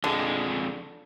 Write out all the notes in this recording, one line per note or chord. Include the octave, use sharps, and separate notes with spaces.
F2 D3 G#3